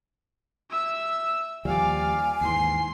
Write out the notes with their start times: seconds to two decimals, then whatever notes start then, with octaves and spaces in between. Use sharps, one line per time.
0.70 E5 E6
1.65 D#2 F3 G3 D5 F5 G#5
2.41 D#2 G#2 E3 C6 C7